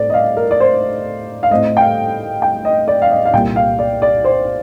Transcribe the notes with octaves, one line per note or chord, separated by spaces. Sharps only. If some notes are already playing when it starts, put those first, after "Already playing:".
Already playing: A2 A3 C4 D5
D#5
F5
A#4
D5
C5
F5
A2 A3 C4 D#5
G5
F5
G5
D#5
D5
F5
D#5
F5
C2 A#2 G3 G5
F5
D5
D5
C5